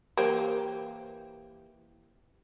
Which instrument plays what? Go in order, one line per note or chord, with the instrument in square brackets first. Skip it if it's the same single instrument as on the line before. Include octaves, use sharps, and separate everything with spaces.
[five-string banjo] E3 G4 C5 [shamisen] A#3